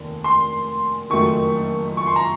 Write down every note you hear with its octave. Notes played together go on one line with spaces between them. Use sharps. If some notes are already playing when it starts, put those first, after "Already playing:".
Already playing: F1 D#2 D#3
C6
F#1 F2 D#3 F#3 A3 C#6
C#6
C6
A#5